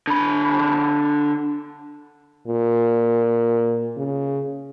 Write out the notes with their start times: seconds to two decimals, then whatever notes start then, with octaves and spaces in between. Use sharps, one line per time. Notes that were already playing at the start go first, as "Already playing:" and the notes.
0.07 D3 B5
2.48 A#2
3.97 C#3